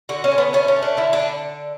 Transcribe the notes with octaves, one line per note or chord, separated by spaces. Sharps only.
D3 F#4
C#4
D3
B3
A3 C#4
C#4
A3
D4
D3 E4
D4
D3